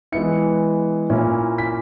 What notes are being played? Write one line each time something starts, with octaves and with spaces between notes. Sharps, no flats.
E3 G#3 B3 E4 C#7
A#2 A#3 C#4 E4
B6